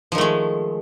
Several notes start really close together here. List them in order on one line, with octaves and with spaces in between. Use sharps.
F3 D#3 A3 G#3